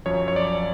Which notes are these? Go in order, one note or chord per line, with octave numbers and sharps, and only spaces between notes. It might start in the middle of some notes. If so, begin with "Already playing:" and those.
F#2 F3 C#5
C#5
D5